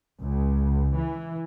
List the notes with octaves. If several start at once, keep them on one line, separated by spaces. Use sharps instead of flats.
C#2
E3